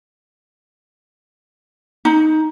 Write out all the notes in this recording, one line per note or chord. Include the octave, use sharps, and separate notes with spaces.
D#4